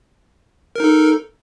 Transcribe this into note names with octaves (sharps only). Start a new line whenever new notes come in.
D#4 A4 A#4